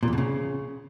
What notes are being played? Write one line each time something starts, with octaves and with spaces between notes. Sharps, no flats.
A#2
E2
B2
C#3